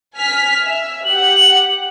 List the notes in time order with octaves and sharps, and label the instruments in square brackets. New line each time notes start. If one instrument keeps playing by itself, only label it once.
[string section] G#5 F6 B6
E5
[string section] G4 F#5 [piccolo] F#7